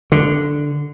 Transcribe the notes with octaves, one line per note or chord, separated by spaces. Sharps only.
D3